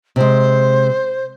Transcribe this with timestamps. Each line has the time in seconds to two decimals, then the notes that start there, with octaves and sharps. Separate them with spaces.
0.16 C3 G#3 C5